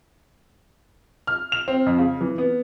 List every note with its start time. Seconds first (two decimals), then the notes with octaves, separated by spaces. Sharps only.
1.27 F6
1.52 F7
1.68 C4
1.86 F2
1.99 C#3
2.21 E3
2.38 B3